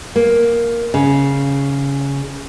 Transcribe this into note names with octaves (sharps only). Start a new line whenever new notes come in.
A#3
C#3